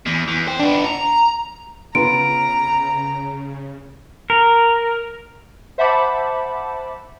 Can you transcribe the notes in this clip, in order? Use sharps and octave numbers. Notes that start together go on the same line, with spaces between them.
E2
E2
C5 G5
B3 D4
A#5
C#3 B3 F4 A#5 D7
A#4
C5 E5 F#5 A5 B5 D6